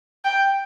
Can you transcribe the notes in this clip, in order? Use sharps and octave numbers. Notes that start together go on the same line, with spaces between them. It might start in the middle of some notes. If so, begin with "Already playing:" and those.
G5